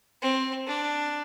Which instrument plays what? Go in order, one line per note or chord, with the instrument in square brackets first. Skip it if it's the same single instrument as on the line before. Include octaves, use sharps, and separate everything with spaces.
[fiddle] C4
D4